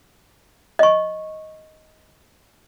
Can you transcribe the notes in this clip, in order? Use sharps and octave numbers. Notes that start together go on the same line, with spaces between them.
D#5 C#6